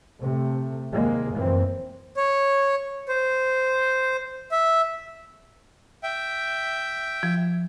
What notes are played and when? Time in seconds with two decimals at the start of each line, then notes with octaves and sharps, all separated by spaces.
0.21 C3 A3
0.91 D#2 C3 G#3 A#3
1.34 F1 F#2 E3 A#3 C4
2.17 C#5
3.08 C5
4.51 E5
6.03 E5 G5
7.23 F3